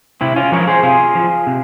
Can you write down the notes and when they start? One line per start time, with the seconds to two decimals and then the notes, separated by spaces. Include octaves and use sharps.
0.21 C3 C4 E4
0.36 C#4 F4
0.52 F3 A#4 C#5
0.67 G#4 C5
0.83 C3 F4 G#4
1.15 F3
1.47 C3